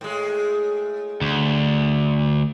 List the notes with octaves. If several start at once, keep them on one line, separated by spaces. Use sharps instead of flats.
A2 G#3
D2